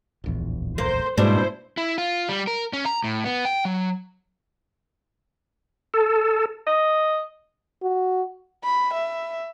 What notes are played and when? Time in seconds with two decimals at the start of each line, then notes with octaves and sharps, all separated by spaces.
0.24 D1 A#1 E2
0.78 A#3 C5
1.18 G#2 B2 G3 A#3 D4 E4 C5
1.77 E4
1.98 F4
2.29 G3
2.47 A#4
2.73 C#4
2.86 A#5
3.04 A2
3.25 B3
3.45 G5
3.65 F#3
5.94 A4
6.67 D#5
7.82 F#4
8.64 B5
8.94 E5